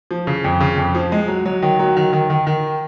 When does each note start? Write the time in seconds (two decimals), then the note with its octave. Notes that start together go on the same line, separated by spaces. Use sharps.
0.11 F3
0.27 C#3
0.44 F2
0.60 C#3
0.77 F2
0.95 F3
1.12 G#3
1.28 F#3
1.46 F#3
1.62 D#3
1.79 F#3
1.97 D#3
2.13 D#3
2.30 D#3
2.47 D#3